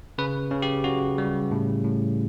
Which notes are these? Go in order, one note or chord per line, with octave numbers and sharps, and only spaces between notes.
C#3 B4
C#3
G4
C#3 F#4
G3
A2
A2